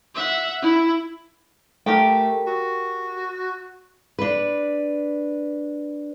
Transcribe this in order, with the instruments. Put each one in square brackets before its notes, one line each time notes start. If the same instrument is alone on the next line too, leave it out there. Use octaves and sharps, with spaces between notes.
[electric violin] E5 F#5
E4
[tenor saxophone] A3 [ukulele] G4 A#4 G5
[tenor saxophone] F#4
[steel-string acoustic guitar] D4 B4